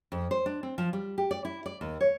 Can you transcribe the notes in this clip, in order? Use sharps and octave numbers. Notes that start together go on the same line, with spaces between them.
F2
C5
D4
C4
F3
G3
G4
D5
E4
D5
D#2
C#5